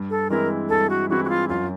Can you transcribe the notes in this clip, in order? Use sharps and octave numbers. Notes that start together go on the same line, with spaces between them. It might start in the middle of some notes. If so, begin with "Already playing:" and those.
Already playing: G2
A4
E3 G#3 C4 E4 A#4
G2 A4
F#4
E3 G#3 C4 E4 F#4
F#4
F4
F#2 F4